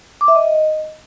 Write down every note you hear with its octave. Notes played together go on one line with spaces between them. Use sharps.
D6
E5
D#5